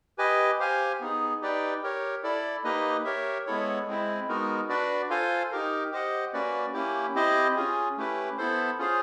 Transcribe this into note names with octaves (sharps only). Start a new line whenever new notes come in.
G4 B4 D#5 G#5
G4 C5 F5 G#5
B3 D#4 G#4
D#4 G4 B4 D5 G5
G4 A#4 C#5
E4 A4 D5
A#3 D#4 G4 B4 D#5
G4 A#4 C#5 E5
G#3 B3 E4 A4 C#5
G#3 C4 E4
G#3 B3 D#4 F#4 A#4
D4 F#4 B4 D5
F4 A4 C5 F5 G#5
D#4 G4 A#4
G4 C5 D#5 F#5
A#3 C#4 F#4 B4 D5
A#3 C#4 E4 G4
C4 E4 G4 C5 D#5
C#4 F4 G#4
A3 C#4 E4 G4 B4
B3 E4 A4 C5
C#4 F4 G#4 C5 F5